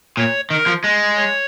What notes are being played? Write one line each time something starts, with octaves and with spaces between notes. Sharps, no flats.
A#2 C#5
D#3 A#4
F3
G#3
C#5